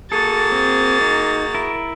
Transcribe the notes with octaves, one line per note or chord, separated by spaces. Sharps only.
A#3 F#4 G#4 A4 A6
C4
D#4
E4 A#4